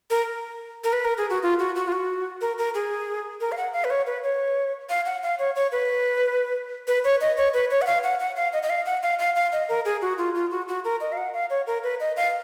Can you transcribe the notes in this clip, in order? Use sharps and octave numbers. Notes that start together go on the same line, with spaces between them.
A#4
A#4
B4
A#4
G#4
F#4
F4
F#4
F#4
F4
F#4
A#4
A#4
G#4
A#4
F5
F#5
F5
B4
C#5
B4
C#5
F5
F#5
F5
C#5
C#5
B4
B4
C#5
D#5
C#5
B4
C#5
F#5
F5
F#5
F#5
F5
D#5
D#5
F5
F#5
F5
F5
F5
D#5
A#4
G#4
F#4
F4
F4
F#4
F#4
A#4
D#5
F5
F#5
F5
C#5
A#4
B4
D#5
F5